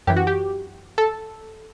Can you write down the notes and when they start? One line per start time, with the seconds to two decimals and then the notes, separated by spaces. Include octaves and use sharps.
0.07 F#2 E3 G4
0.17 F#4
0.27 G4
0.98 A4